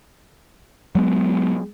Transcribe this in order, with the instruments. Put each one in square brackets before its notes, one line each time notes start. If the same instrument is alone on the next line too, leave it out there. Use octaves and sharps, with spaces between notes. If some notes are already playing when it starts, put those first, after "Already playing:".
[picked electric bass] F#3 G#3 B3